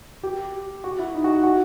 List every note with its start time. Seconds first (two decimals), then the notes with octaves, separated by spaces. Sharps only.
0.23 G4
0.84 F#4
0.99 E4
1.14 D#4
1.24 F#4
1.44 F#4